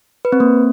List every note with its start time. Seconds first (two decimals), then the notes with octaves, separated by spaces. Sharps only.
0.25 B4
0.32 C4
0.40 A#3